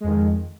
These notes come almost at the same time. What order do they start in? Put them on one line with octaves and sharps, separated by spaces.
G#3 F2 D#3